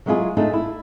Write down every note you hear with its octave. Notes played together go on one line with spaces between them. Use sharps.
F#3 G#3 B3 E4 F4 G#4
A3 D4 D#4 F4 G#4
E4